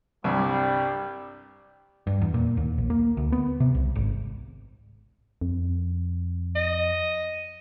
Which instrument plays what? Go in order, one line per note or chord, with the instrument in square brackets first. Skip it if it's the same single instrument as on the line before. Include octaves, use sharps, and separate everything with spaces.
[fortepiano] C2 G2 [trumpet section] G3
[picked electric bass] G2
E2
A#2
D#2
A#1
A#3
D2
B3
C3
C2
G#1
[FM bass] F2
[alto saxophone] D#5